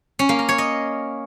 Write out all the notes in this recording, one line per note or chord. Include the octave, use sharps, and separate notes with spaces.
C#4
A#3
A#4
C#5
D#5